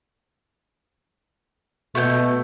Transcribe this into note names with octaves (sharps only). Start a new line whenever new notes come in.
B2 A3 G5 G6